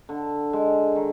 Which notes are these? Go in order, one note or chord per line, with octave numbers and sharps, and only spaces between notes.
D3
G#3
D#3